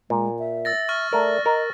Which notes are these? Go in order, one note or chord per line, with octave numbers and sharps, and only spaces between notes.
A#2 G#3
E5
E6 A6 A#6
C#6 F6
A3 A#4 D5
A#4 D#5